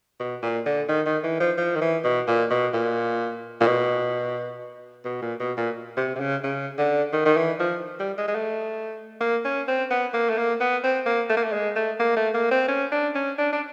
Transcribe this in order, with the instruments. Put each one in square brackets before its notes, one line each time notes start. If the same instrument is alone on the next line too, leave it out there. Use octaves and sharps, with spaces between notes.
[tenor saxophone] B2
A#2
D3
D#3
D#3
E3
F3
F3
D#3
E3
B2
A#2
B2
A#2
A#2
B2
B2
A#2
B2
A#2
C3
C3
C#3
C#3
D3
D#3
D#3
E3
F3
G3
G#3
G#3
A3
A#3
C#4
C4
B3
A#3
A3
A#3
B3
C4
A#3
A3
A#3
A3
G#3
A3
A#3
A3
A#3
C4
C#4
D4
C#4
D4
D4